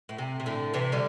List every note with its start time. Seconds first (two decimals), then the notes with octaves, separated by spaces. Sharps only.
0.09 A2
0.18 C3
0.40 C3
0.46 A2 D3
0.74 C3 E3
0.92 D3 G3